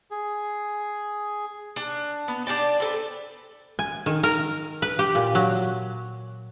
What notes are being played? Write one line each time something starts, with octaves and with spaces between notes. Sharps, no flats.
G#4
D4
B3
D4 D5 G5 A5
C4 A4 B4
G#5
D#3
A#4
B4
G4
A#2
F#3